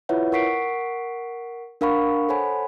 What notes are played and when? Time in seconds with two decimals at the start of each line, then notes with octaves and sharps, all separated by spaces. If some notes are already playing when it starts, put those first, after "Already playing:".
0.09 E4 F4 B4 C#5 E5 F#5
0.32 A#4 F#5 C#6 B6 C7 D7
1.81 D4 A#4 F5 F#5 B5 C#6
2.29 A4 C5 C#5 F#5 G#5 B5